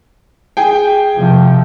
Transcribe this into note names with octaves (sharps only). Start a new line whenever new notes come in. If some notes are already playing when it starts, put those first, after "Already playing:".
G#4 G5
C3 F3